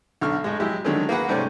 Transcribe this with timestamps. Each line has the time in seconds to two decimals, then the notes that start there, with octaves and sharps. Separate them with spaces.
0.21 B1 D3 C#6 F6
0.44 A2 G#3
0.60 F#3 G#3 E4 G4
0.84 D3 D#3 F#3 G#3 A3 C#4
1.09 A#3 F#4 G#4 B4 F#5
1.28 G#2 C3 G3 A3 C4 C#4